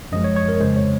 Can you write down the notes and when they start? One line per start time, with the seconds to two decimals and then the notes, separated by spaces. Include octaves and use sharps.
0.12 F#2 F3 G#3 D#5
0.24 C#5
0.36 C#5
0.48 A#4
0.60 F2 C#3 G#3 C5
0.76 C#5